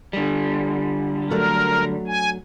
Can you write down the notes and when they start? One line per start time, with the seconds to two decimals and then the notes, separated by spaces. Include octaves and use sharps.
0.13 D3 G3
1.31 F#3 A3 D4 A#4
2.08 G#5